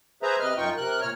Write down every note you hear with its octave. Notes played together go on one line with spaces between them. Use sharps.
G#4 B4 C5 E5 A#5
C3 B4 D#5 F6
F#2 D#4 F4 G5 C#6
C3 A#4 F#6
A#2 C#5 F6